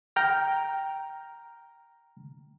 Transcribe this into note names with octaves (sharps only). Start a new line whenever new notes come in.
G5 A#5 F6